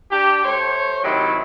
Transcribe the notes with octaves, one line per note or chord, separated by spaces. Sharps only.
D4 G4
A3 C5 C#5
C3 D#3 F#3 E4 G4